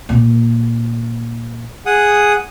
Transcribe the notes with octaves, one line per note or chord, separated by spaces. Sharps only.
A#2 A#3
G#4 F#5 D#6